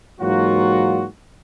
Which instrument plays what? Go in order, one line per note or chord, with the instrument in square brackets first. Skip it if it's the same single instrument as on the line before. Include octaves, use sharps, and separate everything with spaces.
[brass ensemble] G#2 E3 F#3 A#3 F4 F#4